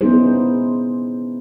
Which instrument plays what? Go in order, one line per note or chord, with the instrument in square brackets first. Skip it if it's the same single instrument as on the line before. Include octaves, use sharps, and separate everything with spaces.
[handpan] B3 C#4 D#4 E4 G#4 C5